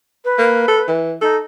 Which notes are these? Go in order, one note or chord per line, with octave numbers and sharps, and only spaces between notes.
B4
A#3
A4
E3
D#4 A4